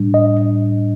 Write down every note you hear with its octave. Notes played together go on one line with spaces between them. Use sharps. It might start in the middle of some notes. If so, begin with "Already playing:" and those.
Already playing: A2 G3 D4
D#5